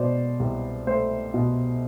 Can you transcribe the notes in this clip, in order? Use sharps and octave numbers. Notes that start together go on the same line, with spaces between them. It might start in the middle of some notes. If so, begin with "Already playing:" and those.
Already playing: B2 C5 D5
C2
A3 C5
B2